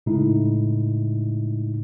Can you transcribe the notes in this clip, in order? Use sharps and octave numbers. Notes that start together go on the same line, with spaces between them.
A2 C#3 G#3 D#4 E4